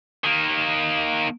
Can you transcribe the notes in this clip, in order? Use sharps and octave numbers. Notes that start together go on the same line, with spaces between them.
D#3 A#3